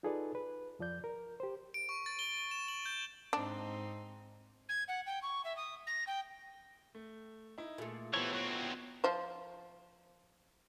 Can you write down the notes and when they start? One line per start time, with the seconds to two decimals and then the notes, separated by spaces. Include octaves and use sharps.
0.03 D#4 F4 G#4 A4 B4 D5
0.35 B4
0.79 F2 F3 D5 G6
1.04 A#4
1.40 G4 C5
1.74 D7
1.89 C#6
2.06 A6
2.19 G7
2.51 E7
2.68 F#7
2.86 G6
3.33 G#2 C4 D4 D#4
4.69 G#6
4.88 F#5
5.06 G5
5.22 C#6
5.45 E5
5.57 D#6
5.87 A#6
6.07 G5
6.95 A3
7.58 D#4 E4
7.78 A#2 A3 G#4 A4
8.14 E3 B3 E4 G4 C5 C#5 A5
8.33 F#3 C4 C#6 F#6 G#6
9.04 F3 C5